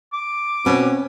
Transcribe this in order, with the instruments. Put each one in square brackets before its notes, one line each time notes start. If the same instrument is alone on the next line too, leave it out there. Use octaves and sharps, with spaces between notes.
[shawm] D6
[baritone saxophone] B2 [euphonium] C4 [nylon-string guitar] C#4